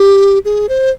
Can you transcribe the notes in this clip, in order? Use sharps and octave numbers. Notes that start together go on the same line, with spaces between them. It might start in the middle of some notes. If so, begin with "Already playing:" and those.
Already playing: G4
G#4
C5